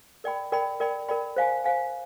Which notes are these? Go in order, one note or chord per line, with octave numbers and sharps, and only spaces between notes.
A#4 D5 G5 B5
A#4 D5 G5 B5
A#4 D5 G5 B5
A#4 D5 G5 B5
C5 F5 G#5
C5 F5 G#5